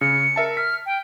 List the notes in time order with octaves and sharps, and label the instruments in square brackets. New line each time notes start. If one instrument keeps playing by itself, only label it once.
[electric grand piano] C#3 [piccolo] C#7
[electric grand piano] A#4 E5 A5
[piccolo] F6 [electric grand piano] B6
[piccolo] G5